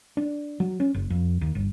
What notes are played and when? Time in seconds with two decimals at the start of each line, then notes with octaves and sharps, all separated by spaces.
0.17 D4
0.60 F#3
0.80 C#4
0.94 F#1
1.10 F2
1.41 D#2
1.55 G1